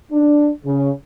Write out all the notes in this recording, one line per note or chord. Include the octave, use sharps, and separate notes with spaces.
D4
C#3